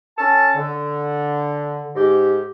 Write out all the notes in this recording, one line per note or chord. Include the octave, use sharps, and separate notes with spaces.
C#4 A4 A5
D3
G#2 G4